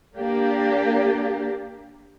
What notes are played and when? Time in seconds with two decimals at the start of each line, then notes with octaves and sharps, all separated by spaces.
0.16 A#3 D4 G4